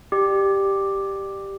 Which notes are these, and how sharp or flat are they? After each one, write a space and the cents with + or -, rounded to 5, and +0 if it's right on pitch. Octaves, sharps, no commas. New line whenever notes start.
G4 +0 D5 +25